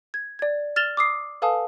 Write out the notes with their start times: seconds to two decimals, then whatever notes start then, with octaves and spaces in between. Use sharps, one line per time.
0.14 G#6
0.39 D5 G#6
0.76 F6 A6 E7 F7 G7
0.97 D6 D#6 C7
1.42 A4 B4 F5 G#5 A5 D#6